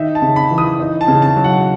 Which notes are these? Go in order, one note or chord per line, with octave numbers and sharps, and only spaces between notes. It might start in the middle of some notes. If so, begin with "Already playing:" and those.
Already playing: D#3 D#4 E5
A5
C#3
B5
E3
D#6
D#4
A5
C#3
A5
F#3
F#5